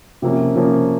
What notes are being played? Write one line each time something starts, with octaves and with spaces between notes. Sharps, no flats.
C3 F3 A#3 C#4
C3 F3 A#3 C#4